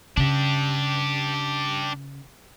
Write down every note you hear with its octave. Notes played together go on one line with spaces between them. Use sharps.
C#3 D4 G4